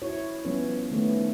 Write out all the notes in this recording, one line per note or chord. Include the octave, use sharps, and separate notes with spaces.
E4 F#4 C#5
F3 G3 B3 C#4 C#5
D#3 A3 B3 C#4